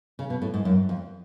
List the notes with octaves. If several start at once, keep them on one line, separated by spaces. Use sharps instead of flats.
C#3
B2
A2
G#2
F#2
F2